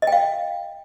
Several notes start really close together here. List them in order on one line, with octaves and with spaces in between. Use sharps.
D#5 G5 F5